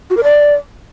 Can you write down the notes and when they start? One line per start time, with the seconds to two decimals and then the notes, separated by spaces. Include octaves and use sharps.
0.10 F#4
0.17 A#4
0.23 D5